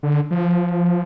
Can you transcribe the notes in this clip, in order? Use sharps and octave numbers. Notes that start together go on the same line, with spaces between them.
D3
F3